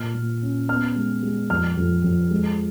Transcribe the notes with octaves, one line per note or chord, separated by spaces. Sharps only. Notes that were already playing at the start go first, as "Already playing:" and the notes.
Already playing: A#2 F6
A#2
C#4
B3 F6
G#3
G#3
F2 F6
F2
F2
G#3